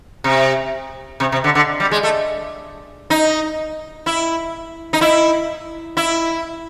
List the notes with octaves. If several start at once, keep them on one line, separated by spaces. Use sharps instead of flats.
C3
C3
C3
D3
D3
G3
G#3
A3
D#4
E4
D#4
E4
E4